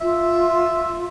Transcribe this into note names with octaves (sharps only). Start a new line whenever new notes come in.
F4 E5